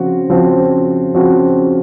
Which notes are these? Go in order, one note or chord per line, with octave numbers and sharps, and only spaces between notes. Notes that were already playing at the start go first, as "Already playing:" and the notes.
Already playing: C#3 F3 C4 F#4
C#3 F3 C4 F#4
C#3 F3 C4 F#4